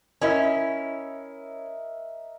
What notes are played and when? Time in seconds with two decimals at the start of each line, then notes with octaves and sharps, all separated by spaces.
0.21 C#4 E4 A#4 D#5 E5